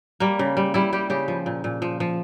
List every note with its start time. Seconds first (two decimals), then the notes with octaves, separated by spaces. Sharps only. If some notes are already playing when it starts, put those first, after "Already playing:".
0.20 G3 A#3
0.39 C#3
0.57 G3
0.74 G3 E4
0.93 G3 G4
1.10 C#3 G4
1.28 F3
1.46 A#2
1.64 A#2
1.82 F3
2.00 F3